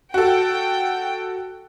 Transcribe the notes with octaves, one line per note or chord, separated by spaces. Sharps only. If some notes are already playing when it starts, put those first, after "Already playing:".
F#4 A4 G5